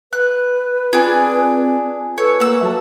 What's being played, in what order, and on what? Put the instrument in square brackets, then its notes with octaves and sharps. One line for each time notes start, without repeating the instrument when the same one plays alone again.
[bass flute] B4 [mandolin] F#6
[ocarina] C4 [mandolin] D4 G#4 [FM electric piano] F4 G#5
[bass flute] A4 [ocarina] B4 [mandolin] C#5
[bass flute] A#3 [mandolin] F#5 E6
[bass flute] F#3 [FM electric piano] E5 A5